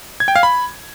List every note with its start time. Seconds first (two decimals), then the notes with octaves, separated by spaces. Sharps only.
0.20 G#6
0.28 G5
0.36 F5
0.43 B5